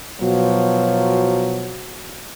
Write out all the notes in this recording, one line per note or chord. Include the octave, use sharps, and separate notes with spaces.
B2 F3 F#3